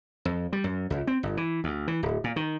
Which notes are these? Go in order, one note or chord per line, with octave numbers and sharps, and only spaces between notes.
F2
G3
F#2
C#2
C4
G1
E3
D2
E3
D1
A#2
D#3